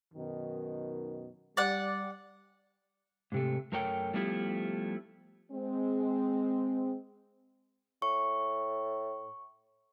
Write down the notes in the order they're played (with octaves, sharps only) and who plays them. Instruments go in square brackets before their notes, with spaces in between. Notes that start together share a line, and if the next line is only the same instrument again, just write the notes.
[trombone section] F#2 B2 D#3
[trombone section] G3 [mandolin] D5 F#5
[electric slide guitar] G#2 C3 A3
F#2 A3 A#4 C#5 G5
F3 G3 A3 B3 E4
[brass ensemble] G#3 C4
[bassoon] A2 [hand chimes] C#6